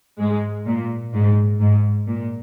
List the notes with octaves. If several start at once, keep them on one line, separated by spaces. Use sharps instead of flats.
G#2 G#3
A#2
G#2
G#2
A#2